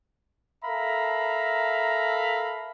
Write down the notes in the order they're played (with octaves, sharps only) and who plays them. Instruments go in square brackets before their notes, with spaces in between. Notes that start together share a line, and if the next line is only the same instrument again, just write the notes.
[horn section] A4 A#4 E5 F5 A#5 B5